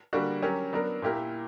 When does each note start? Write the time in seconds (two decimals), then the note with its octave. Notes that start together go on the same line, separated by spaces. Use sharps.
0.13 D3 G3 A#3 D4 F#4
0.42 F#3 C#4 G4 A#4
0.73 F#3 B3 D4 A#4
1.02 A#2 A#3 E4 G4 A#4